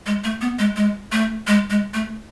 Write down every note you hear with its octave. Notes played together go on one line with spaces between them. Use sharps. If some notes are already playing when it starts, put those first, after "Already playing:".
G#3
A3
B3
G#3
G#3
A3
G#3
G#3
A3